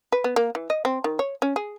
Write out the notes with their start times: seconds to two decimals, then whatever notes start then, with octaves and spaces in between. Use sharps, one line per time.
0.12 B4
0.24 B3
0.36 A#3
0.55 E3
0.70 D#5
0.85 C4
1.04 D#3
1.19 C#5
1.42 C#4
1.56 G#4